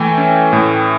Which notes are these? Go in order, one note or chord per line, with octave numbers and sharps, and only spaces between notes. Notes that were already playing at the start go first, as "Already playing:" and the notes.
Already playing: E3 A3 G5 G#5
C#4
A2